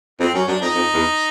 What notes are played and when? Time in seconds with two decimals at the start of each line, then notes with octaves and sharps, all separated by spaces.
0.20 F2 C4
0.34 F#2 C#4
0.48 F#2 D4
0.62 F2 D#4
0.75 F2
0.94 E2